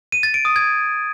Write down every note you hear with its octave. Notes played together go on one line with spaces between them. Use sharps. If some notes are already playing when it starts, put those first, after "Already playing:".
D#7
A6
D7
D#6
G#6